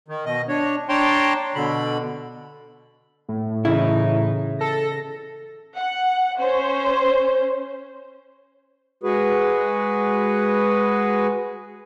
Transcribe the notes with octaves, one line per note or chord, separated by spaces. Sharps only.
D#3
B2 D#5
D4 C#5
D4 C#5 G5 A5 A#5 C6
B2 D3 B5
A2
C#3 E3 D#4 E4
A4 A#6
F#5
C#4 C5
G#3 F#4 G#4 B4